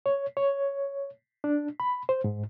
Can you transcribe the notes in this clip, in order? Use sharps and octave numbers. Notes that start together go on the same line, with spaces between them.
C#5
C#5
D4
B5
C5
G#2